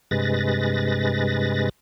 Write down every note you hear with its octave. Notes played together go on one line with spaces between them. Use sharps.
G2 C3 G#3 B4 A6 A#6